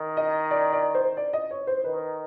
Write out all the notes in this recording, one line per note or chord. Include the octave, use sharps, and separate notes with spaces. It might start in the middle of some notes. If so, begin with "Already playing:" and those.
Already playing: D#3
D#5
D5
D5
C5
D5
D#5
C#5
C5
D#3 B4